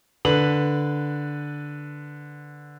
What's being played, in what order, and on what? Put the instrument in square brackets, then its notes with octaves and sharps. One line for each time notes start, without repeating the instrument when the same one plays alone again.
[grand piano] D3 B4 F#7